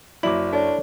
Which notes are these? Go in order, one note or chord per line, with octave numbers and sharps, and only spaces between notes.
F#1 F#3 E4 D5 D6 F#7
D4 A4 C#5 D5